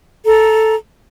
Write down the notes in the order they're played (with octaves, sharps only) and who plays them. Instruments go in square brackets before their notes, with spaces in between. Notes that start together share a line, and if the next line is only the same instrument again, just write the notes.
[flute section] A4 A#5